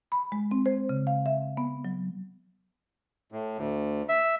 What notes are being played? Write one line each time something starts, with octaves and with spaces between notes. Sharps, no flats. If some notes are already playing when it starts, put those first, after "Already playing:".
B5
G#3
C4
C5
C#3
F5
E5
B3
F#3
A2
D2
E5